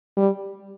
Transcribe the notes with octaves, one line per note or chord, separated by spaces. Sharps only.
G3